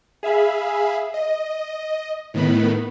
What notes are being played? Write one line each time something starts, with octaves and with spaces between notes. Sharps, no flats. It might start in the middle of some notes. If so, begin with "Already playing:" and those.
G#4 E5 F5 B5
D#5
A2 D#3 B3 B5